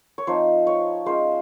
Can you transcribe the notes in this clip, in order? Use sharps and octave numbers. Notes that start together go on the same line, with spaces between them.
C#5
F3 C4 D#4 C5
C#5
G#3 C#4 F4 C5